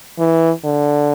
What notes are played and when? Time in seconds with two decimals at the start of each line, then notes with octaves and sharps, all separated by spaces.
0.19 E3
0.64 D3